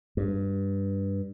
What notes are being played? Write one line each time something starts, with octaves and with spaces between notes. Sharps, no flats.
G2